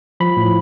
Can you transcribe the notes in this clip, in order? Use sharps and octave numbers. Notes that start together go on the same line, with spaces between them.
F3 B5
A2